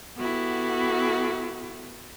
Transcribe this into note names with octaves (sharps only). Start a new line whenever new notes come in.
B3 E4 F#4 G4 A4